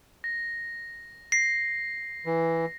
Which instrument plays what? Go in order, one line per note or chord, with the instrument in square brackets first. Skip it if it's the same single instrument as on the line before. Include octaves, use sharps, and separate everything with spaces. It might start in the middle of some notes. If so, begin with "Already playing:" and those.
[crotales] A#6
[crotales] A#6 [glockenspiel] C7
[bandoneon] E3